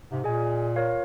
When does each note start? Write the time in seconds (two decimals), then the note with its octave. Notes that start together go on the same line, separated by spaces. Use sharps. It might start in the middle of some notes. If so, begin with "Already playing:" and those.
0.11 G#2 C3
0.24 A#2 G#4 D#5 G#5
0.76 F4 A#4 C#5 F5